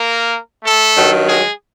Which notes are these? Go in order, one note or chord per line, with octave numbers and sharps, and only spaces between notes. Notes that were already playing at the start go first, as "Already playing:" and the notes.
Already playing: A#3 A#4
A3 A4
G2 D#3 F#3
G#3 G#4